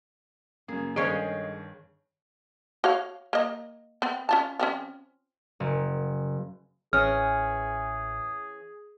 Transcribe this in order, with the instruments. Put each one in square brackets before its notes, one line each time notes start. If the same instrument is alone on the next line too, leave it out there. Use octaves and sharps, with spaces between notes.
[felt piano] F#2 C#3 A#3 [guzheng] G#4
[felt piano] G1 D#3 D7 [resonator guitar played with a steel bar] G#3 C#4 [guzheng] G#4 C#5 F5
[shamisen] F#4 C#5 F5
A#3 D#5
B3 C4
C#4 F4 A5
F3 C4 C#4
[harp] F#1
[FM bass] A1 [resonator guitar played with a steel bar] E3 C#4 [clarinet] G#4 [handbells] F6